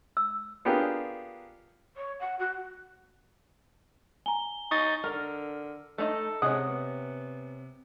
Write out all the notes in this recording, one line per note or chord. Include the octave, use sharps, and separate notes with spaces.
E6
B3 D4 F4 G4 G#4 A#4
C#5
F#5
F#4
G#5 A#5 G7
D#4 C#6 D#6 A6
D3 A#4 F6
A3 D#4 A4 D#5
C3 G#3 C#4 D#5 F#5 D#6
B3